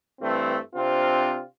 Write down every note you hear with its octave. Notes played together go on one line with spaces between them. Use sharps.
G2 E3 A3 C4
C3 C4 D4 F4